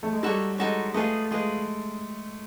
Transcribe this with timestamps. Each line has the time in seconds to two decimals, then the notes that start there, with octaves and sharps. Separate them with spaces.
0.03 A3
0.13 G#3
0.23 G3 D#4 F#4 A4 C#5
0.58 G#3 D#4 F#4 A4 C#5
0.94 A3 F4 G#4 B4 D#5
1.31 G#3 F4 G#4 B4 D#5